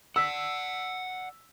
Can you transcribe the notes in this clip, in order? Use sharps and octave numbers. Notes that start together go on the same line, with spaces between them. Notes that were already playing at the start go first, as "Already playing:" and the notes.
D5 F#5 E6 B6